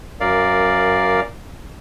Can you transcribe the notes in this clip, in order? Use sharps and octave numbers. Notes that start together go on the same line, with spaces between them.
F#2 A#4 D5 F5